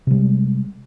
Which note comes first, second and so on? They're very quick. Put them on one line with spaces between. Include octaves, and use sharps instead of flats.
C3 G3 G#3